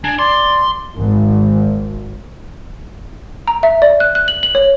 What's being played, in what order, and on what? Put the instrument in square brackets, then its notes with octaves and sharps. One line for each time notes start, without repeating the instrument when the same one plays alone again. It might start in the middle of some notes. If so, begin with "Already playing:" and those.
[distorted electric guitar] D4 [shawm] G#5
[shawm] D5 [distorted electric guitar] C6
[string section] G#1
[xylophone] A#5
E5
D5
F#6
F#6
F#7
F#7
C#5